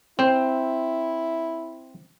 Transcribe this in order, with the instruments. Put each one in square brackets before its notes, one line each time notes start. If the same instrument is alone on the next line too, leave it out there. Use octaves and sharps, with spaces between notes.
[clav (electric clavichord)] C4 C5 [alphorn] E4